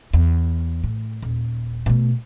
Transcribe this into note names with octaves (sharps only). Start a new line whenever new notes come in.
E2
A2
D#1
B2 A3